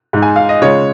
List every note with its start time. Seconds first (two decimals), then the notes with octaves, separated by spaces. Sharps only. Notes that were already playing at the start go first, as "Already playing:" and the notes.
0.13 G#2 G#3 D#4
0.22 G#5
0.36 F5
0.49 D#5
0.62 C#3 G#3 F4 C#5